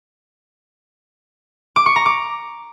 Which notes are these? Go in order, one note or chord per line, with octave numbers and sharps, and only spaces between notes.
D6
C#6
A#5
D6